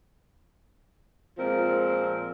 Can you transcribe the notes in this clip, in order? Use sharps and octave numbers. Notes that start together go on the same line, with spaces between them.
A#2 F3 G#3 C4 A#4